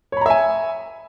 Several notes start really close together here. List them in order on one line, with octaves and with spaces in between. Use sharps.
C#5 B5 A#5 E5 G#5